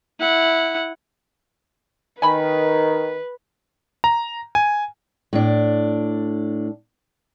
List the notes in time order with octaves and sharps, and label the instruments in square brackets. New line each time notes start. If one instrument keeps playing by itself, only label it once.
[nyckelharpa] E4 F#5
[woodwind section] D#3 [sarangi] B4 [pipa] G#5 B5
[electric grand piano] A#5
G#5
[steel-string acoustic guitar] A2 D4